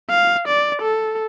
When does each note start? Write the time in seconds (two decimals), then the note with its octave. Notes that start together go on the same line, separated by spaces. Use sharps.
0.10 F5
0.48 D5
0.82 A4